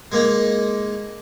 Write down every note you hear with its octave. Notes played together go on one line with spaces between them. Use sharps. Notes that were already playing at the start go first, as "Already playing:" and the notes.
G#3 A#3 D#4